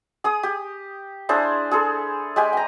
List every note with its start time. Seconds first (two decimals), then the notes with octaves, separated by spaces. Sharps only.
0.24 G#4 D#6
0.43 G4
1.29 D4 E4 G#4 C5
1.71 G#4 A4 C6
2.36 G#3 G4 G#5
2.53 G5 A#5